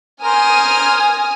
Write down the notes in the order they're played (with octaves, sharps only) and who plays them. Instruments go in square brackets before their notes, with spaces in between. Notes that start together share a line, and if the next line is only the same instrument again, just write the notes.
[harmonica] A#4 C5 [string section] G#5 D#6 F6